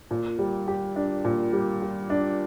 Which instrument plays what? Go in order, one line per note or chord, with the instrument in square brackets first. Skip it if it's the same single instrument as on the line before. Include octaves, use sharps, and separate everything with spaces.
[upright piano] A#2
G3
G4
D4
A#2
G3
G4
D4